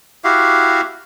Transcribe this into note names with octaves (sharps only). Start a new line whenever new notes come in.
E4 F#4 G4 F5